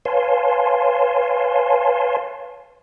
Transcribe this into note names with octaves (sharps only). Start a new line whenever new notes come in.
B4 C#5 F5 G#5 A5 C6